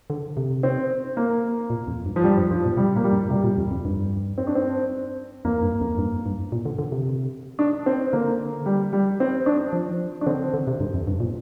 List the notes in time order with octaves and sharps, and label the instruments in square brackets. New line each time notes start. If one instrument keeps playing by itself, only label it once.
[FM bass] D3
C3
[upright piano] C4
A#3
[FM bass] A#2
F2
G2
[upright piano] F3
[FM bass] G2 [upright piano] G3
[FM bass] G2
[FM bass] G2 [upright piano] F3
[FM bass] A#2
[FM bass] C3 [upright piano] G3
[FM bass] A#2 [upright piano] A#3
[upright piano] G3
[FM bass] G2
[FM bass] C3 [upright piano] G3
[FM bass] A#2
F2
F2
G2
[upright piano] C4
D4
C4
[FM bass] F2 [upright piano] A#3
[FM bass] G2
F2
G2
G2
A#2
D3
D3
C3
[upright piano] D4
C4
[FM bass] D3 [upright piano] A#3
[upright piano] G3
G3
C4
D4
[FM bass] F3
[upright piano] D4
[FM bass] D3 [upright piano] C4
[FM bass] D3
C3
G2
F2
G2
A#2